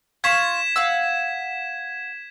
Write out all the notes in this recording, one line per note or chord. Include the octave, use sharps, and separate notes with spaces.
F4 C#6 G#6 B6 E7
F5 F#5 E6